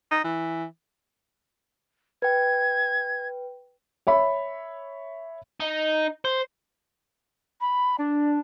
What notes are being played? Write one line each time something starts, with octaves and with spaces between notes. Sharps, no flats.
D#4
E3
B4 G5 G#6
C#5 E5 B5
D#4
C5
B5
D4 D5